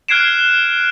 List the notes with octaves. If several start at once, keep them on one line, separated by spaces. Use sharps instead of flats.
F6 F#6 G#6 C7 D7 E7